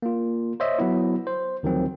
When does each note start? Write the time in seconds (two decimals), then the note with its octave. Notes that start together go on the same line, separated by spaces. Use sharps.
0.02 A#3 F4
0.60 C5 C#5 D#5 E5
0.79 F#3 B3 E4
1.27 C5
1.63 D2 D#3 F3 F#3 C4